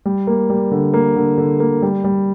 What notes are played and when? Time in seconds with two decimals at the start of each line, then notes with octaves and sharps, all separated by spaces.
0.05 G3
0.27 A#3
0.50 G3
0.71 D3
0.94 A#3
1.16 D3
1.38 D3
1.60 A#3
1.82 G3
2.04 G3